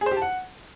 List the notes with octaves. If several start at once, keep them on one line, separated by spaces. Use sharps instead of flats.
G#4
C5
G4
A5
F#5